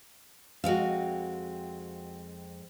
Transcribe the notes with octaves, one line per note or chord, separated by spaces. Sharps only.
F2 G#3 C4 F#4 F5